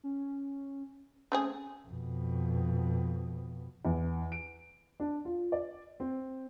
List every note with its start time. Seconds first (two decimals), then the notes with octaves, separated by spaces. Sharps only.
0.04 C#4
1.32 A3 C4 C#4 G#4
1.88 F2 B2
3.85 E2
4.32 D7
5.00 D4
5.25 F4
5.52 D5
6.00 C4